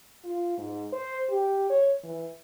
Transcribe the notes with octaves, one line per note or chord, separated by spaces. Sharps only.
F4
G#2
C5
G4
C#5
E3